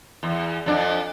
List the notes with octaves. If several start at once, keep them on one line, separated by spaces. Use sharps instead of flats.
E2
F2 D4